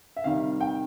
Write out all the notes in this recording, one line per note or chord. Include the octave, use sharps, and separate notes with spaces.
E5
C3 D#3 G3 F5
G5